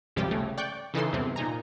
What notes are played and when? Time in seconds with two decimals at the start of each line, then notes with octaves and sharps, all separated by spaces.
0.16 G#1 C#2 C3 F3 G3 G4
0.31 C#3 A3
0.58 D5 G5 C#6 F#6 G6
0.94 C#3 E3 D#4 A4 C6
1.13 E2 G2 C3 C4
1.36 A#2 D#4 G#5 A#5